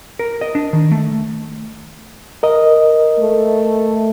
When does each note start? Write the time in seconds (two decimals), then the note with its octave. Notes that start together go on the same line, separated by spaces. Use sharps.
0.19 A#4
0.41 D#5
0.55 D4
0.73 D#3
0.92 A3
2.43 A#4 D#5
3.17 A3